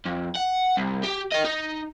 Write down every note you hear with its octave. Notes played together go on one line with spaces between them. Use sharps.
F2
F#5
C2
G4
A#4 D#5
D#4